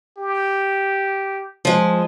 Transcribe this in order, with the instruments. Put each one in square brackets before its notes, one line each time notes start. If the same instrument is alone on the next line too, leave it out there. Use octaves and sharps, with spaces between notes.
[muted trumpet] G4
[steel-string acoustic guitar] F3 G#3